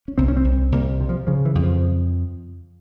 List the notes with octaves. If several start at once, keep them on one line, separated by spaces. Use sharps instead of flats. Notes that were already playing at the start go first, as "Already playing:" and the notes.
C#4
C2 C4
C#4
C4
C2
C2 A#3
C3
F3
C#3 F3
E3
F2
F3